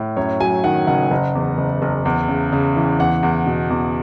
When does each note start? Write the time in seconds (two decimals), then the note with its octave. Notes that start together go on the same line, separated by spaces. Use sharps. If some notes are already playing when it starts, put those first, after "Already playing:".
Already playing: A2
0.17 F#2 C#5
0.40 F#3 G#5
0.64 D#3 F#5
0.87 F#1 F#5
1.11 F#1
1.35 E2
1.58 F#1
1.82 F#1
2.05 E2
2.28 C#3
2.53 C#3
2.76 E3
2.99 E2 F#5
3.23 E2
3.47 B2
3.70 E2